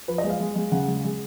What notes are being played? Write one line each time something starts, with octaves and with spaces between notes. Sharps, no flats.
F3 B4
D#5
G#3
F5
G#3
G#3
C#3 F#5
G#3
G#3